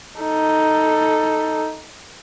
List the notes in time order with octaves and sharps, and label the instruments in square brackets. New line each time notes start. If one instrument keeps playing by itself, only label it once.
[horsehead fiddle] D#4 A4